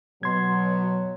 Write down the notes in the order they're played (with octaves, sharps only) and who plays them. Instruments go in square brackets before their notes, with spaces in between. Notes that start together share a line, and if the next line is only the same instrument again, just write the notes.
[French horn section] B2 F#3 [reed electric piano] C6 G#6